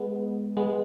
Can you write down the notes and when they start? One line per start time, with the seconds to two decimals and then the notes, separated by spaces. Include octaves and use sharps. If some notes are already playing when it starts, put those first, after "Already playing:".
Already playing: G#3 B3
0.57 G#3 B3